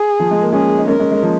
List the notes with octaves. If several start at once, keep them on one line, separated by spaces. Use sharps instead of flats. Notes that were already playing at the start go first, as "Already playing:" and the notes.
Already playing: G#4
F3
G#3
A#3
G#3 C#4 G#4
D#4
G#3 C#4 A#4
G#3 C#4
G#3
F3 A#3